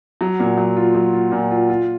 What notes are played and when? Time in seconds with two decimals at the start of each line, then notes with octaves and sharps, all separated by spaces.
0.21 F#3
0.40 A#2
0.57 F#3
0.77 F4
0.95 F#3
1.13 F4
1.32 A#2
1.51 F4
1.70 F4